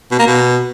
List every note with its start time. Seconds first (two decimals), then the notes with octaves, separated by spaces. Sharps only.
0.11 B2
0.19 A#3
0.27 B2